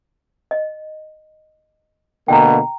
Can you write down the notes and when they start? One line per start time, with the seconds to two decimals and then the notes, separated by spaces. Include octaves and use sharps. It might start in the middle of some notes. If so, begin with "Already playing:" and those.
0.51 D#5
2.28 B2 D3 A#3 G5 A#5